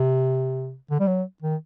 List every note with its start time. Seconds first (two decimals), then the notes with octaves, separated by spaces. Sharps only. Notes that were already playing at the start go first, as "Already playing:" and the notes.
Already playing: C3
0.91 D3
1.00 G3
1.07 F#3
1.42 D#3